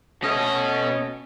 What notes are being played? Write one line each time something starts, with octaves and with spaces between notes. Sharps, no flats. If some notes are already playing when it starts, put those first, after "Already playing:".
B2 A3 C#4 D#5